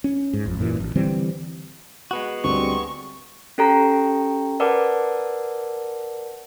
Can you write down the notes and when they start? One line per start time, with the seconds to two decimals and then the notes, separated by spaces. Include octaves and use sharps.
0.04 C#4
0.33 G#2
0.46 G#1 F2
0.59 F#2 A#2 D3 E3
0.80 A1
0.95 D3 E3 G3 C4
2.11 G#3 B3 F#4
2.44 D2 G3 C4 C#6
3.58 C#4 G4 A4 G5 A#5
4.60 A#4 B4 D5 F#5 A5 D6